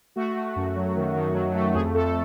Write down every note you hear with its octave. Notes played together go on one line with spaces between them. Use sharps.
A3 F#4
A3
F#2
F#3
D#3
D#3
F#3
A3
F2 G#4
F2 A4